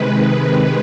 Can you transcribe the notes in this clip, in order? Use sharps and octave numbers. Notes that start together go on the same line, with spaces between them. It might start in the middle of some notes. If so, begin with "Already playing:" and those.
Already playing: C3 D#3 G#3 B4